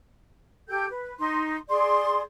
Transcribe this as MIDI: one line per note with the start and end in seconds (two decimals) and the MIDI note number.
0.69 0.86 67
0.69 0.86 69
0.69 0.86 79
0.69 0.86 91
0.88 1.14 71
1.19 1.56 63
1.19 1.56 84
1.69 2.20 68
1.69 2.20 74
1.69 2.20 84